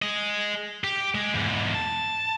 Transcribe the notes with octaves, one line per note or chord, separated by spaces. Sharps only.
G#4 D#5
G4
G#3
E2 G#2
A5